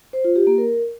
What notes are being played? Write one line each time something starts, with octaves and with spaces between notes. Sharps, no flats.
C5
F4
G4
A#3
A#4